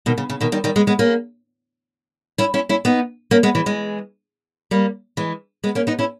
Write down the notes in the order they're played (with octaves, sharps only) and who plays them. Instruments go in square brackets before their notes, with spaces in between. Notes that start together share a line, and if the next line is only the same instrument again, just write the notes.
[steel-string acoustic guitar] B2 D#3
C#3
C#3
B2 D#3
D#3 G3
D#3 G3
G#3 B3
G#3 B3
A#3 C#4
C#4 E4
C#4 E4
C#4 E4
B3 D#4
A#3 C#4
G#3 B3
E3 G#3
E3 G#3
G3 A#3
E3 G#3
G#3 B3
A#3 C#4
B3 D#4
C#4 E4